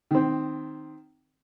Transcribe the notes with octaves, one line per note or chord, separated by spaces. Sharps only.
D#3 C4